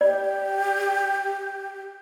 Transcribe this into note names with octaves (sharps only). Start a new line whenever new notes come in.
G4 D5